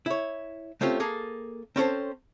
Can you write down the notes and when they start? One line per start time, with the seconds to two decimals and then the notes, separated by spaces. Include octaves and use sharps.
0.06 E4 C#5
0.81 A3 C4 C#4 F4 G4
1.00 A#3 G#4 A4
1.76 C4 C#4 A4 C5